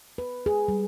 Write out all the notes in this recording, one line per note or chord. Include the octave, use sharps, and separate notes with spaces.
B4
G#4
G3